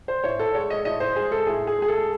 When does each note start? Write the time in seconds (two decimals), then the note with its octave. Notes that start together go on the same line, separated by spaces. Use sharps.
0.08 C5
0.24 A2 C#5
0.39 A4
0.55 G#3 C#5
0.70 D#5
0.85 A2 D#5
1.00 C5
1.16 G#3 G#4
1.32 A4
1.47 A2 G#4
1.67 G#4
1.78 G#3 G#4
1.88 A4